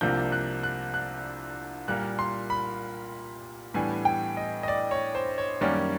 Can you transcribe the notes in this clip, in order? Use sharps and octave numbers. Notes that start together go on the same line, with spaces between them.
C2 C3 F3 A#3 D4 G6
F#6
F#6
F#6
A#2 G3 A#3 F#6
C6
B5
A2 E3 G3 B3 D4 G#5
G5
D#5
D#5
D5
C#5
C5
C#5
F#2 D#3 G3 A#3 C#4 D5